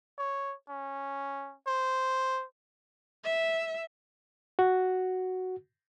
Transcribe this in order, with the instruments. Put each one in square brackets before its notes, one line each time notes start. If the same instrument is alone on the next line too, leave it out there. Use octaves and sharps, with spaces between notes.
[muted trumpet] C#5
C#4
C5
[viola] E5
[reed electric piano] F#4